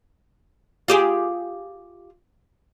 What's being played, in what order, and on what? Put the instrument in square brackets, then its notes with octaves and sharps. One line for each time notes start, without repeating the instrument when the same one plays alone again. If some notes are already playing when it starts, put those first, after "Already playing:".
[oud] F4 G4 G#4